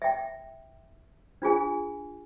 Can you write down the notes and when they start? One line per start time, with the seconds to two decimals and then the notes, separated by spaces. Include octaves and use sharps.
0.02 E5 G5
1.42 D4 F4 G#4 G#5